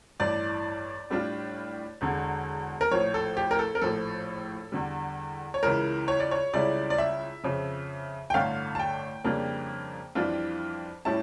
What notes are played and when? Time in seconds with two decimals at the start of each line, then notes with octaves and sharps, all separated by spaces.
0.20 A1 G2 E3 D5
1.10 A2 G3 D4 F4
2.01 E1 E2 D3
2.81 A#4
2.91 A#1 A2 F3 C#5
3.14 A4
3.37 G4
3.51 A#4
3.59 A4
3.75 A#4
3.81 A#1 A2 F3 A4
4.72 E2 D3 G3
5.54 C#5
5.63 C#2 C#3 E3 A#4
6.08 C#5
6.20 D5
6.31 C#5
6.53 C#2 C#3 G3 C#4 E4 D5
6.90 D5
6.98 E5
7.43 F2 C#3 F3
8.30 G5
8.34 A1 G2 D3 A3 F5
8.75 A5
8.79 G5
9.24 F2 C#3 G3 A#3 D4
10.15 F2 E3 G3 D4 F4
11.05 A2 G3 C#4 E4 A5